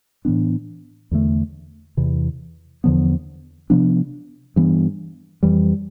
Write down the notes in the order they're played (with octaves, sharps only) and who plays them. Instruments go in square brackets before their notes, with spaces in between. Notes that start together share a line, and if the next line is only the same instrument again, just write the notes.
[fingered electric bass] A2 E3 B3 D4
E2 D3 A3
E2 C3 E3
E2 D3 F3 B3
C3 F3 B3 D4
G2 E3 B3
F2 E3 G3